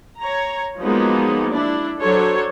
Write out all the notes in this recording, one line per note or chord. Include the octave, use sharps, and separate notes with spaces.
C#5 A#5
F3 F#3 G#3 A#3 B3 D#4
D4 E4
F#3 D4 A4 C5 C#5